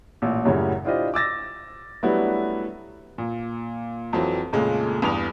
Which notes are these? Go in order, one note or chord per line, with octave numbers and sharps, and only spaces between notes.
A1 A#2
F#2 A2 C#3 F#3 G3 C#4
D4 E4 F4 G4 C5 D#5
D6 E6 A6 A#6
F#3 G3 A3 B3 D4 E4
A#2
F2 E3 F#3 C4
F2 A#2 C#3 G#3 A3
E2 G2 D#6 F7